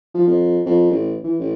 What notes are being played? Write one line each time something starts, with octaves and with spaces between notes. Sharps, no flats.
F3
F2
F2
A1
E3
A1